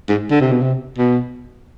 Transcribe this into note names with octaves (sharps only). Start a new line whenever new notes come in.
G#2
D3
C3
B2
C3
B2